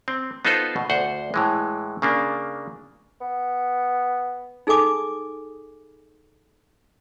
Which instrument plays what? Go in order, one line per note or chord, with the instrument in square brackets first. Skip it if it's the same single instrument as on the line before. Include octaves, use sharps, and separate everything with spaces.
[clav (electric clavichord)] C4
B3 D#4 F4 A4 B4 C5
B2
D2 C5 F#5
A2 E3 G#3
C#3 A#3 D4
[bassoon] B3
[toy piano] D#4 G#4 A4 G#5 D6 D#6